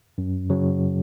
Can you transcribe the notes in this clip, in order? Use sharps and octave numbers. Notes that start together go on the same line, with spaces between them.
F#2
C#3 F#3